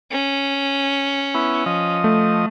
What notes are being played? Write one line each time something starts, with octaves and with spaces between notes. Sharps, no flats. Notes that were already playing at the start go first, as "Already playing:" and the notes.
C#4
B3 E4 C#6
F3 D#5
A3